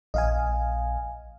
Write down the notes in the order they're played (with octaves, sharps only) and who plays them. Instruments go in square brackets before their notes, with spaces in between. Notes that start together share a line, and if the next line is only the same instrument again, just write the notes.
[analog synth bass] A#1 [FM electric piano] D#5 F5 G#5